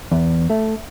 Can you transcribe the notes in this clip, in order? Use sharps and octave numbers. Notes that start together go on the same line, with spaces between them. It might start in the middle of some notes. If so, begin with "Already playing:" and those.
E2
A3